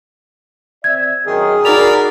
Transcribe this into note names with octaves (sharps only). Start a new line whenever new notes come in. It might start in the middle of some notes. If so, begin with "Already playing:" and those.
C4 D5 E5 G#6
F#2 D#3 G#4
D#4 F#4 A#4 D5 B5 F7